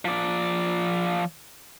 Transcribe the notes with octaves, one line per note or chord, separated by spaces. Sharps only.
F3 D5